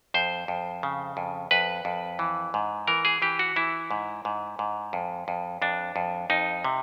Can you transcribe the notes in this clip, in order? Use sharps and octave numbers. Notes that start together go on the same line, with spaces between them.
F2 C5
F2
C#3
F2
F2 B4
F2
E3
G#2
E3 A#4
G#4
E3 G4
F#4
E3 E4
G#2
G#2
G#2
F2
F2
F2 D4
F2
F2 D#4
C3